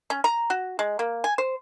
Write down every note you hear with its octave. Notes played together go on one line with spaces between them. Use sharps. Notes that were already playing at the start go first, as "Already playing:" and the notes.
C#4
A#5
F#4
G#3
A#3
G#5
C5